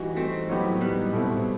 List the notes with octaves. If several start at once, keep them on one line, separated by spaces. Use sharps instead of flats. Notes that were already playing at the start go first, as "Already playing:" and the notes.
Already playing: E3 G3 D#4 F#4
A3 C4
A2 F#3 B3 D#4 G4
G3 B3
B2 A3 C4 E4